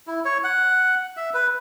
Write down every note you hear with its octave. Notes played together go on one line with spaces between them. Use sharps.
E4
C#5
F#5
E5
B4